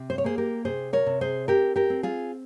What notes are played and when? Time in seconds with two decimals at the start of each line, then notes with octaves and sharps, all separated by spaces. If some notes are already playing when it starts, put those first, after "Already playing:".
Already playing: C3
0.10 C5
0.18 C#5
0.24 A#3 G#4 C5
0.38 G4 A#4
0.65 C3 G#4 C5
0.93 A#4 C#5
1.06 C3
1.21 G#4 C5
1.48 C4 G4 A#4
1.76 G4 A#4
1.90 C4
2.03 F4 G#4